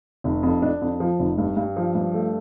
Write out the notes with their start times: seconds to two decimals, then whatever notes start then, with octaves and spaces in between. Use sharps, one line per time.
0.24 F1
0.43 F2
0.62 D4
0.82 F2
1.00 F3
1.19 F1
1.38 G2
1.57 G2
1.76 F3
1.95 G2
2.14 A3